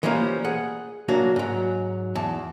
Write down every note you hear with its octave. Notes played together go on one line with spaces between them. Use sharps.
D3 E3 F3 G3 A#3 C#4
G#4 F#5
C#3 F#3 A#3 D4 F#4
G#2 F#3
E2 A5